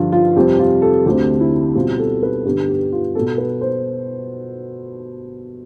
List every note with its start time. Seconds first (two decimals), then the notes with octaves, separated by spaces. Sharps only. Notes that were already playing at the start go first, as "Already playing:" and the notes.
Already playing: G2 D3 F3 F4
0.12 F4
0.36 F2 C3 G3 C4 G4
0.59 F4
0.82 A4
1.06 D2 D3 A3 C4 G4
1.40 E4
1.75 B2 G3 C4 F4
1.99 A4
2.23 B4
2.45 G2 D3 G3 B3 G4
2.69 G4
2.92 F4
3.15 B2 B3 A4
3.38 B4
3.61 C5